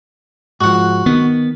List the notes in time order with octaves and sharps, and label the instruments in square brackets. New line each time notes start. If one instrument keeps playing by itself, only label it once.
[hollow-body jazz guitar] G#2 F3 [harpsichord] F#4 F#5
[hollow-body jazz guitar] D#3 [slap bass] B3